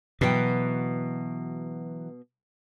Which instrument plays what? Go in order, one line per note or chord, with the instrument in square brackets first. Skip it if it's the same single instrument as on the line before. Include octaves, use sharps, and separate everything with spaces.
[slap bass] B2 [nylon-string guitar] E3 F#3 G5